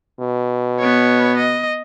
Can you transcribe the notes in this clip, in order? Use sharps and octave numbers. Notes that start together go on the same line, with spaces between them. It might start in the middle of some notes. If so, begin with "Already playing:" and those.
B2
B3 C#5
D#5